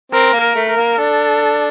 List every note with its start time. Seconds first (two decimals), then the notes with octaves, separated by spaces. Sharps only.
0.12 C4 A#4
0.33 A#3
0.41 A#4
0.56 A3
0.70 A#4
0.76 A#3
0.98 D4 A4